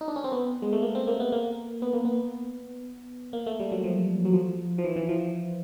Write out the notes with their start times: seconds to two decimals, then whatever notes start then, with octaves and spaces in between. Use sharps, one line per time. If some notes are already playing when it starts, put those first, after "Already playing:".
0.01 D#4
0.08 D4
0.16 C#4
0.24 C4
0.32 B3
0.62 G#3
0.72 A3
0.82 A#3
0.95 C4
1.07 A#3
1.20 B3
1.32 A#3
1.82 B3
1.93 A#3
2.05 B3
3.33 A#3
3.46 A3
3.60 G3
3.72 F#3
3.84 F3
4.25 F#3
4.33 F3
4.78 F3
4.84 E3
4.96 E3
5.09 F3